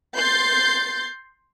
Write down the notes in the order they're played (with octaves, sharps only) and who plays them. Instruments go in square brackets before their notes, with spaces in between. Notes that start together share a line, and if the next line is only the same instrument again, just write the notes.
[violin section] C6 G6 A6